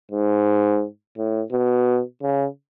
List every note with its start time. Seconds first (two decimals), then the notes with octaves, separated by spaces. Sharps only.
0.11 G#2
1.17 A2
1.52 B2
2.22 C#3